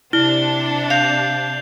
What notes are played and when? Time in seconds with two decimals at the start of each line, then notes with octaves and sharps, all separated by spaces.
0.13 C3 D4 E4 G7
0.90 F5 G6 C7 F7